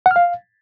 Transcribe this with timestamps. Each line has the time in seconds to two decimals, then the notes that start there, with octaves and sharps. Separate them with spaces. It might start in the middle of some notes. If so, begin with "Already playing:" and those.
0.06 F#5
0.11 F6
0.16 F5